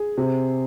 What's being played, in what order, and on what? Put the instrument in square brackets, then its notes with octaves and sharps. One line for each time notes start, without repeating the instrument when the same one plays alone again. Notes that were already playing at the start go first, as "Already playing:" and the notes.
Already playing: [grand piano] G#4
C3